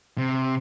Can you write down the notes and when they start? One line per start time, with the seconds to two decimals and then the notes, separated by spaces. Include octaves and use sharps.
0.18 C3